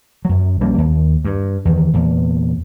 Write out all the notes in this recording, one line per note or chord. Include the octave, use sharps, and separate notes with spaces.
F#2 F#3
A#1 G3 A#3 C#4
D#2
G2
E2 D#3
E2 A#2